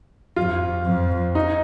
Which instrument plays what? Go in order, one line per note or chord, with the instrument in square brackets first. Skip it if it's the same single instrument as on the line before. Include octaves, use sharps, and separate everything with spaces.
[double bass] F2 [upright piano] F4
[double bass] F2
[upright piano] D#4